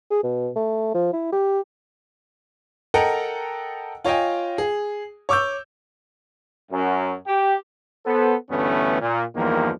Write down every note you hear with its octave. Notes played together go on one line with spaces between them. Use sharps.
G#4
B2
A3
F3
E4
G4
A4 A#4 D#5 F#5 G5 A#5
F4 C#5 D#5 G5 G#5
G#4
C#5 C#6 D6 E6 G6
F#2
G4
B3 A4 C5
D2 G2 E3 A3 B3 C#4
A#2
E2 G2 D#3 F3 A#3